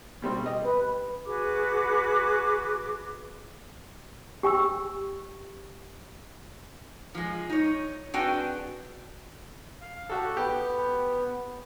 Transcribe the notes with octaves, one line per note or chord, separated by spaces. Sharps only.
B2 G3 C4
G4 D#5
B4
F#4 G#4 B4 D6
G4 G5 C#6 E6
F3 G#3
D#4 C#5
C4 D4 F#4 G#4 B4 G5
F5
F#4 G4 A4
B3 G4